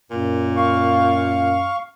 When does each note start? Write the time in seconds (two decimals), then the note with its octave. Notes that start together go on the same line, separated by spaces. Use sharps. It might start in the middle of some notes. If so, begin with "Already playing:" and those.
0.11 F#2 A#2
0.56 F5 C#6